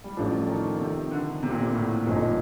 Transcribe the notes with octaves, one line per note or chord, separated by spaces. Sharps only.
G3
A1 A2 F3 A3 D4
D#3
C3
D3
C3
A#2
C3
A2
G1 G2 A#2 F3 C4 D#4